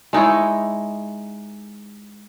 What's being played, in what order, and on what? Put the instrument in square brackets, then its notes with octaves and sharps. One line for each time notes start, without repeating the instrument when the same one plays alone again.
[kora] G#3 D#4 E4 C#5